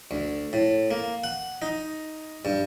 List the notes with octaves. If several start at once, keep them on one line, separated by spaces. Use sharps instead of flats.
D2
A2
A#3
F#5
D#4
G2